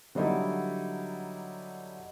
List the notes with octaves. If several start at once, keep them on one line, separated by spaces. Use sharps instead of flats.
D3 F#3 G3 D#4 E4